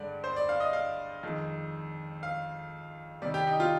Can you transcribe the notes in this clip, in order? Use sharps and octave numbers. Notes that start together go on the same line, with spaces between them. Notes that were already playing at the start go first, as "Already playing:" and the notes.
Already playing: G2 D3 G#3 D5
C5
D5
F5
D#5
F5
F2 D#3 G#3
F5
C3 D#3 G3 D5
G4
D#4
F4